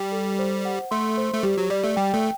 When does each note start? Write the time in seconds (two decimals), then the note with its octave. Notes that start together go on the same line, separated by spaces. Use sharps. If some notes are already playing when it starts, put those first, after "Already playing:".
Already playing: G3 G5
0.12 A4
0.39 C5
0.65 F#5
0.91 A3 C6
1.17 C5
1.34 A3
1.43 G3 G4
1.58 F#3
1.70 G3 D5
1.84 A3
1.96 G3 G5
2.14 A3